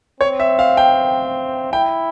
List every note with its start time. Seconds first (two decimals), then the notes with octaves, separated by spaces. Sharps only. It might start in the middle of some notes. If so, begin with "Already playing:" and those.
0.21 C4 C#5
0.40 E5
0.59 F5
0.77 G5
1.73 E4 G5